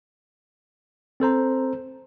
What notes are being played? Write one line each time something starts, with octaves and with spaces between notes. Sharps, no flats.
C4 A4 C5 A#5